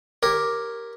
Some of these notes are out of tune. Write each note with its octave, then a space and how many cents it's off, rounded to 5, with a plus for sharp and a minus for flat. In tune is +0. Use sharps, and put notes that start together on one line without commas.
G4 +0 A#4 +0 C#5 -15